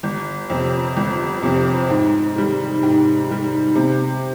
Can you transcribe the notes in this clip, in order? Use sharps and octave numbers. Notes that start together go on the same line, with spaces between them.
G1
F2 C3
G1
F2 C3
G#2
D#3 G3
G#2
D#3 G3
C3